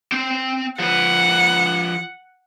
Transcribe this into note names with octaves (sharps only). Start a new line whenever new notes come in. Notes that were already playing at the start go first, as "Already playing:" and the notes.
C4 G5
F3 B4 F#5